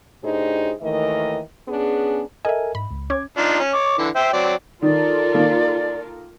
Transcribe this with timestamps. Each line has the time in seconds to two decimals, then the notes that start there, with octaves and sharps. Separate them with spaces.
0.23 A2 D4 D#4 G4 G#4 C5
0.81 D#2 D#3 E3 A3 A#4 D#5
1.68 B3 C#4 D4 G#4
2.45 A4 A#4 D#5 E5 G#5
2.75 G#2 B5
2.91 C#2
3.10 C#4 D6 G#6
3.38 D4 D#4 F4
3.60 C#4
3.74 C#5 D6
3.98 D3 E3
4.16 C5 E5 G5
4.33 F#3 C4 D5
4.82 D#3 F4 A4 A#4 D5
5.34 D#3 A#3